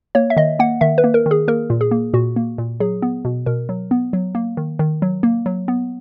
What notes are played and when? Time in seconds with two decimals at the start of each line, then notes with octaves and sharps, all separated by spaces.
0.15 A#3 C#5
0.30 E5
0.37 D#3 D#5
0.59 A#3 F#5
0.81 D#3 E5
0.98 B4
1.04 A#3
1.14 A#4
1.26 D#3
1.31 G#4
1.48 A#3 A#4
1.70 A#2
1.81 G#4
1.91 A#3
2.13 A#2 F#4
2.36 A#3
2.58 A#2
2.80 F#3 G#4
3.02 B3
3.25 B2
3.46 B2 A#4
3.69 F#3
3.91 B3
4.13 F#3
4.35 A#3
4.57 D#3
4.79 D#3
5.02 F#3
5.23 A#3
5.46 F#3
5.68 B3